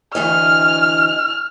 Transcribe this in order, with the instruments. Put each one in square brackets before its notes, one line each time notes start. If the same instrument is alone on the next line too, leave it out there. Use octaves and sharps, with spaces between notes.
[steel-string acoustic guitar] D2 E3 D#5 [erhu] F6